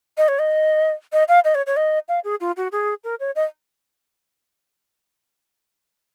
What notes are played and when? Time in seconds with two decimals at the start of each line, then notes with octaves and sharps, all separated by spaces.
0.17 D#5
0.28 C#5
0.39 D#5
1.12 D#5
1.28 F5
1.44 D#5
1.55 C#5
1.66 C#5
1.76 D#5
2.08 F5
2.24 G#4
2.40 F4
2.57 F#4
2.72 G#4
3.04 A#4
3.20 C#5
3.36 D#5